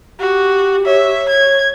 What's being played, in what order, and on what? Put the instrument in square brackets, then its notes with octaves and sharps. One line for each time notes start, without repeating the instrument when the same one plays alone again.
[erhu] F#4 [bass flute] G4
[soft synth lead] C#5 [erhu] E5
[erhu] G#6